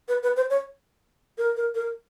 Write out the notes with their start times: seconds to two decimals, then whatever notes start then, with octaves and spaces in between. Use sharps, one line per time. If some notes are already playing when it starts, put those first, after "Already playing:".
0.08 B4
0.23 B4
0.36 C5
0.50 C#5
1.38 A#4
1.56 A#4
1.75 A#4